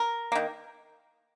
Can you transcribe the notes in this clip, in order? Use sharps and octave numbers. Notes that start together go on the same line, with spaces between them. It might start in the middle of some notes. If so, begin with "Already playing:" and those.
Already playing: A#4
D#3 A#3